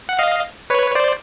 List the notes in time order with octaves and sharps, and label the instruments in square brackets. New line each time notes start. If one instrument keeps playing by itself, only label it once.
[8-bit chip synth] F#5
D#5 F5
B4 C#5
C5 D5